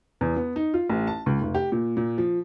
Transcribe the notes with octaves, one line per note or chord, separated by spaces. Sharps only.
E2
B3
D#4
F4
A1
A5
C#2
F1
G4
A#2
A#2
F3